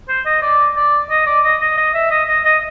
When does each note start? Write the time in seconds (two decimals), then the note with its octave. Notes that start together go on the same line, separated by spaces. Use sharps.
0.09 C5
0.25 D#5
0.42 D5
0.76 D5
1.10 D#5
1.27 D5
1.44 D#5
1.61 D#5
1.78 D#5
1.94 E5
2.11 D#5
2.28 D#5
2.45 D#5